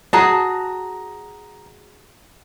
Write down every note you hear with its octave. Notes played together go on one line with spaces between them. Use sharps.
F#4 G#4 A5 A#5